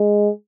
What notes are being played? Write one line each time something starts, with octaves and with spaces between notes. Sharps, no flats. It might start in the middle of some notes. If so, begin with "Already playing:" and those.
Already playing: G#3